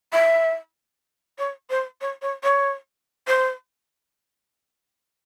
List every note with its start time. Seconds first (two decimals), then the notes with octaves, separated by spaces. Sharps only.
0.13 E5
1.39 C#5
1.70 C5
2.01 C#5
2.22 C#5
2.43 C#5
3.27 C5